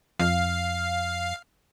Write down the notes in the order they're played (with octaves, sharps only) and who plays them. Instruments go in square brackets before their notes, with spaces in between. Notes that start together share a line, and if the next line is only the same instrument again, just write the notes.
[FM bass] F2 [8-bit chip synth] F5